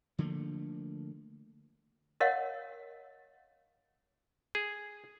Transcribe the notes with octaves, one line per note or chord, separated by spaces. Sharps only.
D3 F3 A3 A#3
A#4 C#5 D#5 F5 F#5
G#4